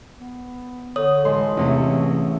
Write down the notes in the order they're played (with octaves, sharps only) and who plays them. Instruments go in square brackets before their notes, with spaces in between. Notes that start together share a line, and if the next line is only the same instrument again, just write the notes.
[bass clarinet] B3
[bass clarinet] D3 [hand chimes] C#5 D#6
[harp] A1 [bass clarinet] G#3 [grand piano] C6
[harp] E2 C#4 [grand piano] C3 [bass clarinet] A3